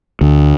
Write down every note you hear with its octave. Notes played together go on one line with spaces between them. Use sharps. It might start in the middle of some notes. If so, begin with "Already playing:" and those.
D2